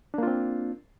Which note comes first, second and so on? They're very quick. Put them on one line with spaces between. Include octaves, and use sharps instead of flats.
D4 A#3 F4 C4